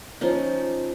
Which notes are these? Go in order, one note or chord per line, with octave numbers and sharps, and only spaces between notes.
F3 C#4 D#4